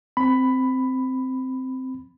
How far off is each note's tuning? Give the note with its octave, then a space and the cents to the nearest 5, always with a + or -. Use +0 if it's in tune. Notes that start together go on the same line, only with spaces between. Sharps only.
C4 -10 B5 +10